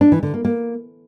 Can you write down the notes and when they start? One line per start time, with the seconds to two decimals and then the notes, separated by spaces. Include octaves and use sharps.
0.01 D4
0.12 E3
0.23 D3
0.34 A#3
0.45 A#3